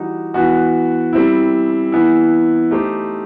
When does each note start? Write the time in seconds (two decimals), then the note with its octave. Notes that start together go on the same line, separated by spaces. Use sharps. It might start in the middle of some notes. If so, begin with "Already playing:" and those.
Already playing: E3 G3 D#4 F#4
0.34 E3 B3 F#4
1.13 G3 C4 E4
1.92 E3 B3 E4
2.71 A3 D#4 G4 C5